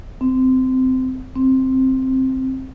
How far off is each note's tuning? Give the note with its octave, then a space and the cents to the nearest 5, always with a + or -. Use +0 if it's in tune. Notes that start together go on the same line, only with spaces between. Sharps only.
C4 -20
C4 +5